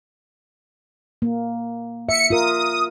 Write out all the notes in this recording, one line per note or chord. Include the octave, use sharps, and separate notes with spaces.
A#3
E5 C#7
F4 A#4 D#6